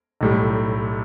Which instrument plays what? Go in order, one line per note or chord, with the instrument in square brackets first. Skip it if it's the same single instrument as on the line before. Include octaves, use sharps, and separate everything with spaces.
[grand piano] B1 A2 G3